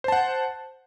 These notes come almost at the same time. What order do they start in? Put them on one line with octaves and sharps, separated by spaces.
C5 A5 F#5